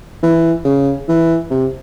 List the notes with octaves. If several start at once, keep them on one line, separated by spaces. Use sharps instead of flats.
E3
C#3
E3
C3